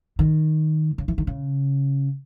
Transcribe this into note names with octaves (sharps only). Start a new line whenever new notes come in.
D#3
C#3
E3
D#3
C#3